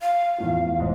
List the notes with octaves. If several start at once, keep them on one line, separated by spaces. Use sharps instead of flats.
F5
E2 A2 F3
E1 G#2 D#5